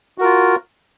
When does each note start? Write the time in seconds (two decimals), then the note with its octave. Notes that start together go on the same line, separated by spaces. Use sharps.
0.18 F#4
0.21 A#4
0.24 F4